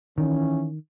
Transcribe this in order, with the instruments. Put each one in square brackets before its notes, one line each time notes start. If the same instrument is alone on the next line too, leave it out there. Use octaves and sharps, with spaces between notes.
[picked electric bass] D#3 [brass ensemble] E3 C#4